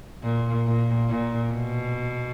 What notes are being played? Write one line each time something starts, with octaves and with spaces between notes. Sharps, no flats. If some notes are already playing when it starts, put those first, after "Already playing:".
A#2
A#2
A#2
B2